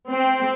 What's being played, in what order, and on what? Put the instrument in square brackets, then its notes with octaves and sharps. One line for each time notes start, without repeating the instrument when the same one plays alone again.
[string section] C4